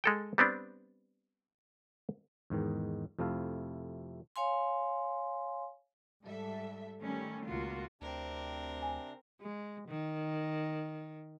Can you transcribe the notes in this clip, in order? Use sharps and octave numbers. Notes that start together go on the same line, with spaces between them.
G#3 A4 G5
G3 B3 C4 D4
E2 G#2 D#3
F2 C3 A3 E4 F5
C#5 F5 G#5 C6
G#2 G3 A4 E5
D#3 G3 A3 C#4
C#2 A#3 F4 F#4
D2 C3 C4 D4 A#4
G#5
G#3
D#3